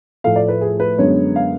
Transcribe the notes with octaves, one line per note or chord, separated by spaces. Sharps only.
A2 F3 A3 F5
D5
B4
G#4
B4
F#2 D3 G#3 B3 C#5
F5